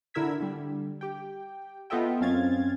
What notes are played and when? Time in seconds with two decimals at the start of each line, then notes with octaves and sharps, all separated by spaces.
0.14 D3 E4 A#4 E6 G#6 B6
0.40 D3 G3
1.01 G4 G5
1.90 B3 F4 A4 D#5 E5 G5
2.21 F#2 C4 C#4 F5 G#6 A6